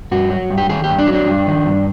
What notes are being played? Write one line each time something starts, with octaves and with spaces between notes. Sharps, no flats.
G2 F#4
F#3
G2
G4
D#3 G#4
G2 G4
D4
F#3
D4
G2
D#3
G2